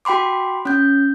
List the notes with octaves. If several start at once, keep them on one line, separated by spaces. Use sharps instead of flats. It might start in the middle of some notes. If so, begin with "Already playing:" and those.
F#4 G5 B5 C6 D6
C#4 G6